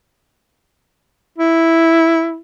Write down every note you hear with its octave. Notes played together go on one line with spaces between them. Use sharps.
E4